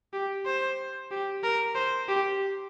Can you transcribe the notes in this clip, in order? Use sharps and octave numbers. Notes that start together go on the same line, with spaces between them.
G4
C5
G4
A#4
C5
G4